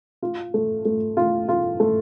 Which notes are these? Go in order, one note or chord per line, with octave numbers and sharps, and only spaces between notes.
F4
A3
A3
F4
F4
A3